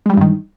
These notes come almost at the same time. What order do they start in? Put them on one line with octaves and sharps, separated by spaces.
G#3 G3 E3 G2 D#3